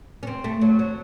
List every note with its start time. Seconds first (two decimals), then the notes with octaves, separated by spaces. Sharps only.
0.23 C#4
0.27 C4
0.44 A3
0.61 F#3
0.79 F#3